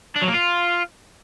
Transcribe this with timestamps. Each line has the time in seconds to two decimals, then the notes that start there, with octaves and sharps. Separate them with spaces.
0.16 D4
0.22 F#3
0.28 A#3
0.34 F4